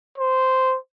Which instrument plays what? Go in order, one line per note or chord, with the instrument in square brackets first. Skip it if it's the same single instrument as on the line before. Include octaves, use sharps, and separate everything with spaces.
[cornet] C5